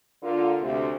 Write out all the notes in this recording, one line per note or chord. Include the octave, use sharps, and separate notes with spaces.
D3 A#3 F4
D2 C3